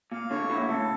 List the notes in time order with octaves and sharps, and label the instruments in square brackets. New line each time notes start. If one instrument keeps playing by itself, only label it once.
[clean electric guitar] A#2 [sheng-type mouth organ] F5
[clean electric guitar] A#2 D3 [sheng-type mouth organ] C#5
[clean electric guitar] A#2 D3 [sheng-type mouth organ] E4
[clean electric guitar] A2 C#3 [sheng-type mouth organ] A4